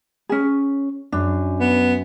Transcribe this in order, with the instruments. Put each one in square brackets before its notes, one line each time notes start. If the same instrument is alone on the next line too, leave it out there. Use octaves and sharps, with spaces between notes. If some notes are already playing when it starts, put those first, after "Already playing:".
[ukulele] C#4 G#4
[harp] F#2 [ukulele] D4
[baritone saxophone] B3